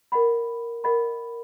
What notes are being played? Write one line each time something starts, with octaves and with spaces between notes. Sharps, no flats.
A#4 D#5 F#5 B5
A#4 D#5 F#5 B5